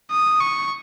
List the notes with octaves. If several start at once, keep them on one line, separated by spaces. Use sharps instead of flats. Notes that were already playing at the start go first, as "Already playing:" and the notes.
D#6
C#6